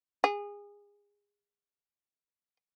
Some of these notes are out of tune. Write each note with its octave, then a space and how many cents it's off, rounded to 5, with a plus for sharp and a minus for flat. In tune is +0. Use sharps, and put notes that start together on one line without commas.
G#4 -25